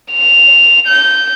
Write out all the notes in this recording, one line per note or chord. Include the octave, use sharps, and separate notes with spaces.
F7
G6